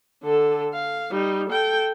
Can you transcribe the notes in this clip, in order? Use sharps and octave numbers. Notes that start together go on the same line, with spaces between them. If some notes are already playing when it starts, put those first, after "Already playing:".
D3 A4
F5
G3 D#4
A4 G5